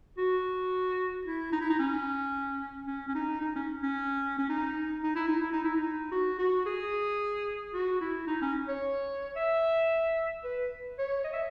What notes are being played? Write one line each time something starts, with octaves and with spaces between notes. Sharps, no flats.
F#4
E4
D#4
E4
D#4
C#4
C#4
C#4
D#4
D#4
C#4
C#4
C#4
D#4
D#4
E4
D#4
E4
D#4
E4
D#4
F#4
F#4
G#4
F#4
E4
D#4
C#4
C#5
E5
B4
C#5
D#5
E5